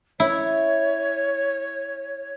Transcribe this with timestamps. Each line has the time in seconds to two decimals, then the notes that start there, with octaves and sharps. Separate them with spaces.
0.20 E4 C#5